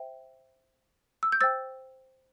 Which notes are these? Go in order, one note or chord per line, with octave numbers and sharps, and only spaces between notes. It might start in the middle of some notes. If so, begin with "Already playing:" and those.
Already playing: C5 E5 G5
E6
G6
C5 G5 E6 A6